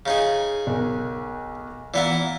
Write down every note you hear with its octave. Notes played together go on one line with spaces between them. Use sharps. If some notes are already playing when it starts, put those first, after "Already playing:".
C#3 D#4 G#4
B1 A#4
E3 B3 E4 D5 F5 A#5